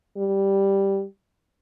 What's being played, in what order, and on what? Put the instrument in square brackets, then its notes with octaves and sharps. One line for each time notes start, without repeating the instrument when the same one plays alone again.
[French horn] G3